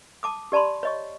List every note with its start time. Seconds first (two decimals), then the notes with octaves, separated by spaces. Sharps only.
0.23 A5 D6 D#6
0.52 G4 D5 A5 B5 C6
0.83 C#5 D#5 C#6